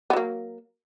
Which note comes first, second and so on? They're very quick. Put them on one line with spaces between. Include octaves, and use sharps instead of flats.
B3 F#3 A#3